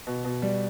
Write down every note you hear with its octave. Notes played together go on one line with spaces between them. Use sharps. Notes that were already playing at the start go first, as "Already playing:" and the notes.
B2
B2
G3